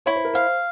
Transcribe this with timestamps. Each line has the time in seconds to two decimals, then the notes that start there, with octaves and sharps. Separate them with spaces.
0.06 E4 C#5
0.16 C5
0.25 A#4
0.34 C5 F5